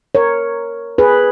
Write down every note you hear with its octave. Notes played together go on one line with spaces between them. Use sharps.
A#4 C#5
G#4 B4